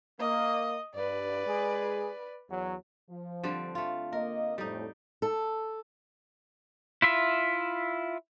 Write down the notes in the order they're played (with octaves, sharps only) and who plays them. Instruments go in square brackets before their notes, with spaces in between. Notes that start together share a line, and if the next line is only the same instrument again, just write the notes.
[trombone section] A#3 [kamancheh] D#5
[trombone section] G2 [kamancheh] B4 D5
[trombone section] G#3 G#4
E2 F#3
[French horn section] F3
[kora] D3 G3 C4
A3 F4
[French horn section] A#3 D#5 [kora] A#4
[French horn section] F2 A2 [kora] G3 D#4
[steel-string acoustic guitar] A4
[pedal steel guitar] E4 F4 E5